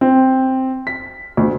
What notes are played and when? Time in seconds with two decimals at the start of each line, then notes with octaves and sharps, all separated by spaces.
0.01 C4
0.87 B6
1.37 D2